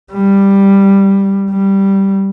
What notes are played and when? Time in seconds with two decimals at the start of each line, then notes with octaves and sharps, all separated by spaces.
0.12 G3
1.50 G3